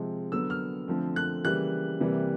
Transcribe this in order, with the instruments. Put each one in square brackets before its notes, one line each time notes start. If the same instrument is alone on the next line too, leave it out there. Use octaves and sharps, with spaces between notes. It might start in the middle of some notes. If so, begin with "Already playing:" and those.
Already playing: [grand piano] C3 F3 G#3 C4
D3 F#3 B3 E6
F6
D3 F3 A3 C4
F#6
C#3 E3 G3 A#3 F#6
C3 E3 G3 A#3